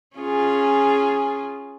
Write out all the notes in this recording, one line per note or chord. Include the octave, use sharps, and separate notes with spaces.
C#4 F4 G#4